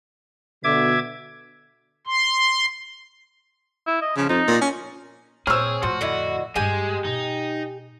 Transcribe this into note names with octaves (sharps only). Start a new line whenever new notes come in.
B2 D3 E5 D6 G#6
C6
E4
D#5
C#3 F3
F2 D#4
A#2
C#4
A#2 C4 G#4 C#5 E6 F6
F2 A2 F3 F#4
D3 E4 D#5
G2 G#3 D4 G4 G#5
B2 D#4